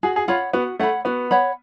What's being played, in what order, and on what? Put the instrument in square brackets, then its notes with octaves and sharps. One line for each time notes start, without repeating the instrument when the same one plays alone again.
[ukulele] F#4 [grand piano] G#4
[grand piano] G#4
[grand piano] F4 [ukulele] C#5 F#5 B5
[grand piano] B3 [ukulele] F#4
[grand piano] A3 [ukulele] C#5 F#5 B5
[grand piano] B3 [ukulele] F#4
[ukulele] C#5 F#5 B5